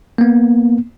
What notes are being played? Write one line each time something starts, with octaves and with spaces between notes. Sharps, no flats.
A#3 B3